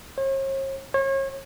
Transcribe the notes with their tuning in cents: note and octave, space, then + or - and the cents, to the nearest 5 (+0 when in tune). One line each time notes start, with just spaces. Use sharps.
C#5 -45
C#5 -35